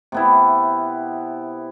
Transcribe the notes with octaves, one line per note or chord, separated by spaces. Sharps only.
C3 B3 E4